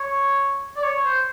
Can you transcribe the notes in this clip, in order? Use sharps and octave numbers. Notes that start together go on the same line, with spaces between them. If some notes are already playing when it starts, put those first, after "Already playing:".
Already playing: C#5
D5
C#5
C5